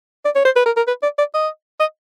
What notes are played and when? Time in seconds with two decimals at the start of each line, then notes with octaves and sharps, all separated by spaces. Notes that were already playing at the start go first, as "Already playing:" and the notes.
0.25 D5
0.35 C#5
0.45 C5
0.56 B4
0.66 A#4
0.77 A#4
0.87 B4
1.03 D5
1.18 D5
1.34 D#5
1.80 D#5